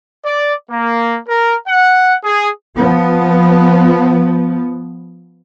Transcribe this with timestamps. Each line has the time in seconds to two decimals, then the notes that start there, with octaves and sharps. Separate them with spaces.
0.24 D5
0.70 A#3
1.28 A#4
1.67 F#5
2.23 G#4
2.77 F3 B3